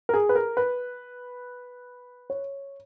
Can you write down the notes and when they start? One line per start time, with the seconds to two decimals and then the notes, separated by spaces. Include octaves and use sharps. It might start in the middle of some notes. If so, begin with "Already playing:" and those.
0.09 A#4
0.14 G#4
0.29 B4
0.35 A#4
0.57 B4
2.30 C#5